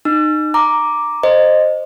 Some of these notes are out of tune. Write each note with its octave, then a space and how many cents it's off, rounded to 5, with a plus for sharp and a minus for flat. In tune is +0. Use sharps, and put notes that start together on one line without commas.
D#4 -25 E6 +45
A#5 +0 D6 +0
C5 +0 D#5 -15